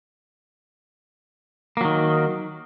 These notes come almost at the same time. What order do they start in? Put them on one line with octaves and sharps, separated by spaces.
A#3 F#3 D#3